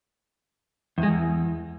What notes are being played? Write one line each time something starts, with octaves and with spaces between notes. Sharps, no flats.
E2
G#3
E2